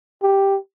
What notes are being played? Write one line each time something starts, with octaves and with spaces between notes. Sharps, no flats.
G4